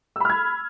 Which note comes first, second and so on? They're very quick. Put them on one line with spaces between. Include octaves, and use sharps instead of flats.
E6 B5 F6 G#6